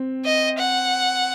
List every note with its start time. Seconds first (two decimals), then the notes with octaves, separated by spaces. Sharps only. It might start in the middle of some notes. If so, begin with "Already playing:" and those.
Already playing: C4
0.25 D#5
0.59 F#5